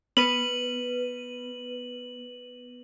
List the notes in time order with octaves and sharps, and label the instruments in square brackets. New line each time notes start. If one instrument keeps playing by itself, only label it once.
[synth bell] B3 B4 D#7 [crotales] F#7